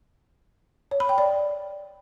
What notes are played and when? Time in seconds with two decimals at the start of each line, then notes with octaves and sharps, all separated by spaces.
0.91 C#5
1.00 B5
1.09 G5
1.18 D5